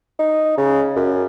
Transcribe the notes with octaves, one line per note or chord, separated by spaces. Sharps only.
D#4
C#3
F#2